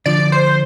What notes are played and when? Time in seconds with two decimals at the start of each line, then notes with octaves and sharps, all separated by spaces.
0.06 D3 F3 D5
0.32 C5